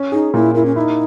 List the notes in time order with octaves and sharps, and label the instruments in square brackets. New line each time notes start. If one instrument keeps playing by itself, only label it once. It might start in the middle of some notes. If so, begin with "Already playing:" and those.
Already playing: [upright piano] C#4
[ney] D#4 [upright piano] G#4
[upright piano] A#2 [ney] E4
[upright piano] A#3 [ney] E4
[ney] C#4
[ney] D#4 [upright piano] E4